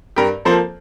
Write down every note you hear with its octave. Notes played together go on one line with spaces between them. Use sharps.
G2 G4 A#4
F3 A#3 A4 C5